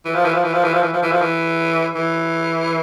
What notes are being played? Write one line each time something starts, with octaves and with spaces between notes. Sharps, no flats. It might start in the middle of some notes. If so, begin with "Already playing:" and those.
E3
F3
E3
F3
E3
F3
E3
F3
E3
F3
E3
F3
E3
E3